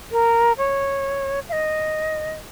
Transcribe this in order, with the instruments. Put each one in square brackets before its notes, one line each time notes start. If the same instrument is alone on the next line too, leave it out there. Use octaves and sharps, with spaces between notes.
[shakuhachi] A#4
C#5
F5
D#5